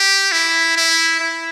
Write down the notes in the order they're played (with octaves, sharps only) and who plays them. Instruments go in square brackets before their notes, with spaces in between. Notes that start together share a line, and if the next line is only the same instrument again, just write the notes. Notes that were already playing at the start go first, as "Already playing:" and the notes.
Already playing: [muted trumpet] G4
E4
E4
E4